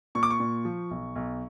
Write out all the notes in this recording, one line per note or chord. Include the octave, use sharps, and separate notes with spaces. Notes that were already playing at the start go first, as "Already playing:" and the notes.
A#2 C#6
D6
C#6
A#2
F3
B1
B1